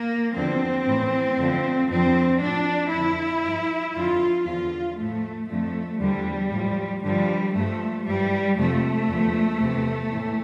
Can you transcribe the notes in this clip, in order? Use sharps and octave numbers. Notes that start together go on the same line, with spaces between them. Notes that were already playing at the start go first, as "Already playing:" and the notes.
Already playing: A#3
E2 D3 F3 C4
A2 E3
F2 D3 F3
F2 D3 F3 C4
A2 F3 D4
F2 D3 F3 E4
G2 F3
F2 D3 F3 F4
E2 D3 F3 F4
A2 F3 A3
F2 D3 F3 A3
E2 D3 F3 G3
A2 F3
G2 D3 F3 G3
G2 F3 A3
G2 E3 G3
F2 C3 F3 A3
E2 D3 F3
E2 C3 F3
A2 E3